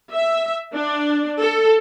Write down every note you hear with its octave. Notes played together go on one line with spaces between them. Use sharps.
E5
D4
A4